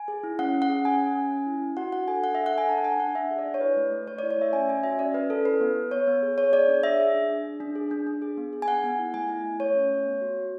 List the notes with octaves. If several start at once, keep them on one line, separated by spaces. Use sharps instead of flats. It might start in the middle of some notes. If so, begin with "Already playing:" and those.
Already playing: G#5
G#4
E4
C#4 F#5
C#4
F#5
G#4
C#4 G#5
C#4
C#4
C#4
E4
E4
F#4 F#5
D4 F#5
A4 G#5
D4 F#5
A4 E5
F#5
A4 G#5
D4 A5
F#5
D4 G#5
D4 F#5
D4 E5
G#4
D5
D4
C#5
E4 B4
A3
A3
A3 C#5
E4 D5
C#5
A3 E5
C#4 G#5
C#4 G#5
F#4 E5
C#4 D5
C#4 B4
C#4 A4
E4 B4
B3
B3
B3 C#5
B3
G#4
G#4 C#5
G#4 D5
D4
G#4 E5
G#4
D4
D4
D4
D4
G#4
D4
D4
G#4
B3
G#4
G#5
B3 F#5
B3
E4
A3 G#5
E4
A3
A3 C#5
C#4
A3
B3
F#4
F#4